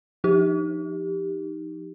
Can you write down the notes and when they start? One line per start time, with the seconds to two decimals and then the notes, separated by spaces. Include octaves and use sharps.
0.24 F3 D#4 G4